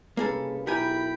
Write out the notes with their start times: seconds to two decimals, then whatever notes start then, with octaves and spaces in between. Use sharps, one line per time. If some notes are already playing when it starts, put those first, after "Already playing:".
0.17 C2 C#3 A#3 G#4 A4 B4
0.67 B1 E4 G4 A#4 G5 G#5 B5